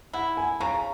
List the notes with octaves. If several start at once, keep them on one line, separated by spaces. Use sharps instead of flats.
E4 F#5
G#5
C#3 A#5